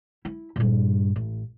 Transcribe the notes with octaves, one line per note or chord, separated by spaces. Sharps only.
E4
G2 A#2
A1